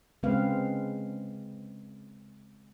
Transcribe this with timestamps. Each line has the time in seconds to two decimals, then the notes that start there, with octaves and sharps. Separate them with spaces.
0.23 C#3 G#3 C4 B4 F5